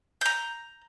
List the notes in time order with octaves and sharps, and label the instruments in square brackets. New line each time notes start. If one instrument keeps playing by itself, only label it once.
[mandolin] A#5 G6